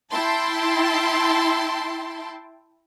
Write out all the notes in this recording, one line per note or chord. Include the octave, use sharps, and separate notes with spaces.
E4 G5 A5 C6